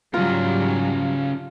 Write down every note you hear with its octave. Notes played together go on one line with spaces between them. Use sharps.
G#2 C#3 F#3 G3 F4 A#4